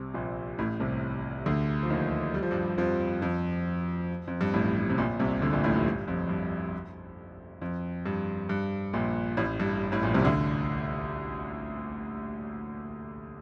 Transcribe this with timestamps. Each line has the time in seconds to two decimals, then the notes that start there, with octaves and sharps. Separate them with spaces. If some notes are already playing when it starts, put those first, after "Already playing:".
Already playing: C2 C3
0.14 A#1 A#2
0.59 A1 A2
0.80 C2 C3
1.46 D2 D3
1.83 F3
1.90 D#2 D#3
2.34 G3
2.42 F3
2.51 G2 G3
2.78 F2 F3
3.22 F2 F3
4.27 F2
4.41 G2
4.54 A1 A2
4.90 C3
4.98 A#1 A#2
5.20 C2 C3
5.42 D2 D3
5.53 A#1 A#2
5.64 A1 A2
5.75 G2
5.86 G2
6.08 F2
6.29 G2
7.61 F2
8.06 G2
8.49 G2
8.93 A#1 A#2
9.37 A1 A2
9.60 G2
9.92 A1 A2
10.03 A#1 A#2
10.14 C2 C3
10.25 D2 D3